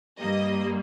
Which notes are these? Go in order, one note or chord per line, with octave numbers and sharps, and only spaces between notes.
G2 G3 A#3 D#5